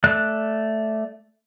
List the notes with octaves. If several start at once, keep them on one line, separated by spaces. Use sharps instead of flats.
A3 D5 F#6